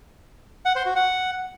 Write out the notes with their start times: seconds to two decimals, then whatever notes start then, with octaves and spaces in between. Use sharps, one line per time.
0.65 F#5
0.75 C5
0.86 F#4
0.96 F#5